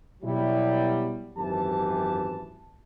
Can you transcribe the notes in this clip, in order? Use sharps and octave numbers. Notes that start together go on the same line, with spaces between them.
B2 F#3 G3 E4
G#1 F#2 E3 G4 A5